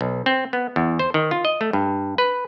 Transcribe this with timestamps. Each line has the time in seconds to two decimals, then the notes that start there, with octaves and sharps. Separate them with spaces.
0.01 B1
0.26 C4
0.53 B3
0.76 E2
0.99 C5
1.14 D#3
1.31 F4
1.45 D#5
1.61 A3
1.73 G2
2.18 B4